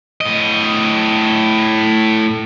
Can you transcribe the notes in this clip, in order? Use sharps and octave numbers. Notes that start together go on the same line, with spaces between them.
A2 D#5